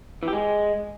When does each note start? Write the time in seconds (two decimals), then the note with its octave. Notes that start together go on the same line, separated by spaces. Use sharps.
0.23 E3
0.28 G4
0.33 G#3